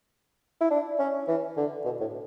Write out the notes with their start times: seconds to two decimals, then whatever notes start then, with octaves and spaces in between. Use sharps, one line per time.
0.61 E4
0.71 D4
0.99 C#4
1.28 E3
1.57 D3
1.85 B2
2.01 A2